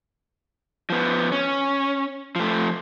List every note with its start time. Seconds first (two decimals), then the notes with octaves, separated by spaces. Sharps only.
0.90 F3 B3
1.32 C#4
2.36 F3 A3